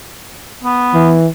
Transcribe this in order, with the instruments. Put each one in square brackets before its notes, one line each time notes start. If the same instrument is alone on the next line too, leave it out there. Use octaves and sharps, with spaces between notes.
[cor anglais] B3
[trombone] E3